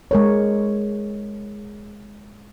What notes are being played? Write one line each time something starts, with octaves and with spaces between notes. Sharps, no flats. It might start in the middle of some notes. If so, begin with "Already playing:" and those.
G#3 A#4 C#5